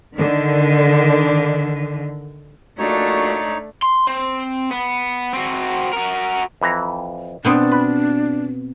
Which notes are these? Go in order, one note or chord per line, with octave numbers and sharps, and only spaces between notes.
D3 D#3
A#1 A#2 A3 D4 D#4 F#4 C#5
C6
C4
B3
C4 F#4
F#4 A#4
F2 E3 A#5
B2 B3 C4 D4
B4